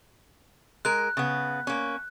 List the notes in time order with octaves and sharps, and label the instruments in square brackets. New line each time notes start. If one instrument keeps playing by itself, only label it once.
[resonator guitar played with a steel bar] G#3 A#4 [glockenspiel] F#6
[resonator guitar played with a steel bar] C#3 B3
A#3 C#4